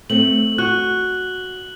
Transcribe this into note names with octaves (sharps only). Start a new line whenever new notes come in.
A3 C4 F#7
F#4 F#6